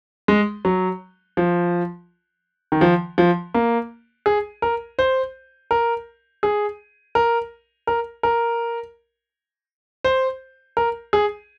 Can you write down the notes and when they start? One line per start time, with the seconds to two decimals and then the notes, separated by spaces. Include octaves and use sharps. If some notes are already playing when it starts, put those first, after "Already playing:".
0.28 G#3
0.65 F#3
1.37 F3
2.72 D#3
2.81 F3
3.18 F3
3.54 A#3
4.26 G#4
4.62 A#4
4.99 C5
5.71 A#4
6.43 G#4
7.15 A#4
7.87 A#4
8.23 A#4
10.04 C5
10.77 A#4
11.13 G#4